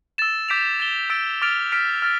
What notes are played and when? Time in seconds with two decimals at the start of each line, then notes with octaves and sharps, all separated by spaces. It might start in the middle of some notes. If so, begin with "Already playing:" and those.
0.18 E6 A6 E7
0.49 D6 G6 B6 D7 F7
0.80 A6 E7 G7
1.10 E6 A6 D7
1.42 D6 F6 A6 D7 F7
1.72 F6 B6 D7 F7
2.02 F6 A6